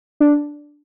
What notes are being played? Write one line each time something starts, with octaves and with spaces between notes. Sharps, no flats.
D4